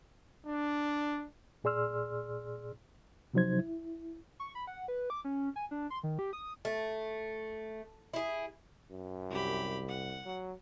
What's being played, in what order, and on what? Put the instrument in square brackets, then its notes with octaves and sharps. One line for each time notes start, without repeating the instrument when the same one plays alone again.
[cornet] D4
[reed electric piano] A#2 G#4 D5 C6 E6 F6
C3 F3 F#3 D#4 C5 G#6
E4
[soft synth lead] C#6
B5
F#5
B4
D6
C#4
G#5
D4
C6
D#3
G4
D#6
[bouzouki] A3
E4 G#4
[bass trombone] F#2
[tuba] C2 [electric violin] G4 B5
[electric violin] F#5
[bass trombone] F#3